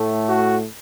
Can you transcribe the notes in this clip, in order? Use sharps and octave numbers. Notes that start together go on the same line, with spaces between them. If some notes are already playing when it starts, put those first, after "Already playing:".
Already playing: A2 A3
F#4